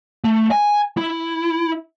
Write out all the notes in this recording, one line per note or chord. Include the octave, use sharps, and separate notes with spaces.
A3
G#5
E4